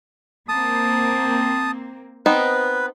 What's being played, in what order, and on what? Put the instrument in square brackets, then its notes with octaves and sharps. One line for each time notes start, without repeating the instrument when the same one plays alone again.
[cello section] A#3 C4 [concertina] A5 D#6
[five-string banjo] B3 C4 D#4 [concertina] B4